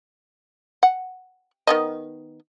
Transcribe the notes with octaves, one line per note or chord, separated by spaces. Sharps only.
F#5
D#3 B3 D#5